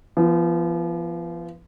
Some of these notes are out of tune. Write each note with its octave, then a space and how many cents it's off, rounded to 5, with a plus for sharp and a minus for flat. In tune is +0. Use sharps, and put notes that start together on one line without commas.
F3 -35 B3 -5